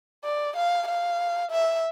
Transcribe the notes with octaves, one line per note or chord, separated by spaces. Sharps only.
D5
F5
F5
E5